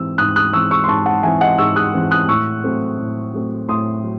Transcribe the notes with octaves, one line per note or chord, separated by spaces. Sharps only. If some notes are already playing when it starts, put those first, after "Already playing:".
Already playing: G#2 E3 C4 E6
G#2 D#6 F#6
D#6 F#6
E3 C4 C#6 E6
C#6 E6
C6
G#2 A5 C#6
F#5 A5
E3 C4 E5 G#5
D#5 F#5
G#2 C#6 E6
D#6 F#6
E3 C4
D#6 F#6
A2 C#6 E6
F#3 A3 C4
A2
F#3 A3 C4
A2 C6 D#6
F#3